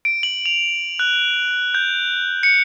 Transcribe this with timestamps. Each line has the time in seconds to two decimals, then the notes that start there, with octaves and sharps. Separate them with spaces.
0.05 D7
0.23 F#7
0.46 F7
0.99 F#6
1.75 G6
2.43 C#7